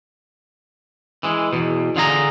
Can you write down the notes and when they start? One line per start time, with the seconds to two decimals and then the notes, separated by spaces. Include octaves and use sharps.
1.23 E3 G#3
1.53 E2 B2
1.96 D3 F4 G#4 A#5